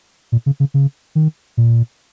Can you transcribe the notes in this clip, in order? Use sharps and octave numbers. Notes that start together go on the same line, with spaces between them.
A#2
C#3
C#3
C#3
D#3
A#2